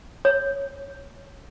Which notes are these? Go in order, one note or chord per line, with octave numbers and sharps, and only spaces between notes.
C#5